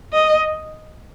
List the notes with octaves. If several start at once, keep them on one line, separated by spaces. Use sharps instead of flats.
D#5